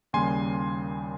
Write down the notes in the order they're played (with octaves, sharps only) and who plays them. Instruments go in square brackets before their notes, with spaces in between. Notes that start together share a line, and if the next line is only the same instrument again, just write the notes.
[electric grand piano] D#2 C#3 G3 A#3 G#5 C6